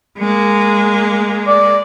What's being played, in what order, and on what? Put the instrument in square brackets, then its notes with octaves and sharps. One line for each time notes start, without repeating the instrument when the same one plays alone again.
[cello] G#3 A#3
[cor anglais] D5